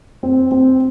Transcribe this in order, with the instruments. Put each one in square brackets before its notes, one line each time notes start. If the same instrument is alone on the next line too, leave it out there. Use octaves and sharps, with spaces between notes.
[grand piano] C4
C4